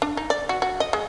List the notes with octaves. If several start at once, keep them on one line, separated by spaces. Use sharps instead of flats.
D4
D#4
D5
F#4
F#4
D#5
G#3